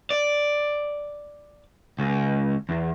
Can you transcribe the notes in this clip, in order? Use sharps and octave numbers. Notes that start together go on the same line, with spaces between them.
D5
C#2
E2